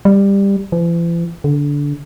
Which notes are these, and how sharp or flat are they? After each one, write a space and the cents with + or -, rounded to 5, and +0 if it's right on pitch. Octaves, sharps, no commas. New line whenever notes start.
G3 +15
E3 +45
D3 -20